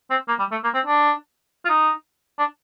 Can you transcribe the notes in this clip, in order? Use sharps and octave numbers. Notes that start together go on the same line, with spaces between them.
C4
A#3
G3
A3
A#3
C4
D4
F4
D#4
D4